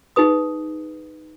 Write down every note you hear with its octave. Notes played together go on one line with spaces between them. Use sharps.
D#4 G#4 B4 D#6